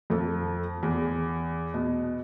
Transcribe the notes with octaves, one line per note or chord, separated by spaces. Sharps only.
F2 A4
E2
B2